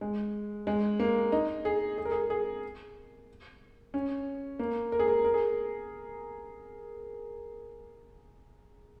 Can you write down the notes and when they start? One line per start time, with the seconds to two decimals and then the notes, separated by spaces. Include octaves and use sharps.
0.01 G#3
0.67 G#3
1.00 A#3
1.32 D#4
1.65 G#4
1.98 G#4
2.05 A#4
2.12 G#4
2.30 G#4
3.94 C#4
4.59 A#3
4.92 A#4
4.99 G#4
5.08 A#4
5.24 A#4
5.34 G#4